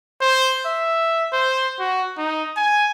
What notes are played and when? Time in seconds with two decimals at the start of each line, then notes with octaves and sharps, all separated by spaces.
0.21 C5
0.65 E5
1.32 C5
1.79 F#4
2.17 D#4
2.56 G#5